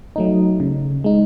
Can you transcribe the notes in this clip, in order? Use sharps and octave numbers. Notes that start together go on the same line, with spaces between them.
F#3 A3 D#4
C#3
G#3 D#4